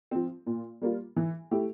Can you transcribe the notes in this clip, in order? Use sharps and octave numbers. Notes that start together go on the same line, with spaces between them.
F3 C4
A#2
G3 A#3 F4
E3
A3 E4 G4